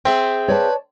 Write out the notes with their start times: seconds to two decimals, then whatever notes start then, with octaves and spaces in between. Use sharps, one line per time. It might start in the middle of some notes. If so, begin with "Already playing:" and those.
0.05 C4 G#4 E5 G5
0.48 B4 C#5 D5 A5